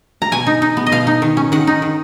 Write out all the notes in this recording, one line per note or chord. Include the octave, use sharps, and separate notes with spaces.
A#5
B2 G#5
D#4
D#4
B3
D#5
B2 F5
D#4
D#3
C#4
D#3 F#5
D#4
D#3